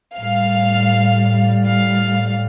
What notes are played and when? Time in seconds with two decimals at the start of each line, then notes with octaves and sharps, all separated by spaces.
0.17 A2 G3 F5
1.66 F5